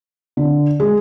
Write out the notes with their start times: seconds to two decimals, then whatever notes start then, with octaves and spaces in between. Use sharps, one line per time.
0.37 D3
0.80 G#3